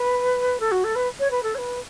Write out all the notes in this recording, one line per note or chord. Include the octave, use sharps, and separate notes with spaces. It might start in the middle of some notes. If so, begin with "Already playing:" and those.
Already playing: B4
A4
F#4
A4
B4
C#5
B4
A4
C#5
B4